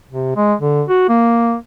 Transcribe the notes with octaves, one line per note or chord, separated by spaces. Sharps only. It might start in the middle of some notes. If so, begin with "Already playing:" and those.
C3
G#3
D3
F#4
A#3